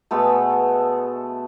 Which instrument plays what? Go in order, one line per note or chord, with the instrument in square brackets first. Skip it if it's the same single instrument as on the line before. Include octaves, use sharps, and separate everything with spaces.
[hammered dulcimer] B2 G#3 A3 B3 A4